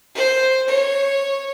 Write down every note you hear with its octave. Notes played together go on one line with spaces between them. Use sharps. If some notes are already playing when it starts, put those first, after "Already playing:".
C5
C#5